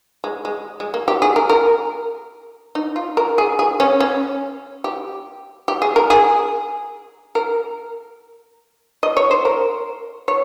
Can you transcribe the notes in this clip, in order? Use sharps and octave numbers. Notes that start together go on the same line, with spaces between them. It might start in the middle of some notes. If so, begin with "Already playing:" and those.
G#3
G#3
G#3
A#3
G4
G#4
A#4
A#4
D#4
F4
A#4
G#4
G#4
C#4
C#4
G4
G4
G#4
A#4
G#4
A#4
D#5
C#5
C5
A#4
C#5